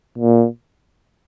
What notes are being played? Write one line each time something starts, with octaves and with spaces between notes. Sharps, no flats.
A#2